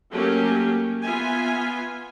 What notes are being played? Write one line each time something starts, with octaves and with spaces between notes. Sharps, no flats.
F#3 A3 A#3 C#4 G4
B3 F4 E5 G#5